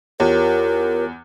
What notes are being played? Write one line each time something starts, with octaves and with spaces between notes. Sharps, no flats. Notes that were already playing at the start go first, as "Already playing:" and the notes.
E2 F4 G4 A#4 C#5